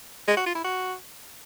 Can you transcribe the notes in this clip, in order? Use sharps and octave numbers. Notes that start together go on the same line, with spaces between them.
G#3
F#4
F4
E4
F#4